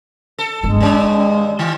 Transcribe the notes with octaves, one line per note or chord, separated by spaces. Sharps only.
A4
G1 G#3 D4
G2 D#3 C#4
D#3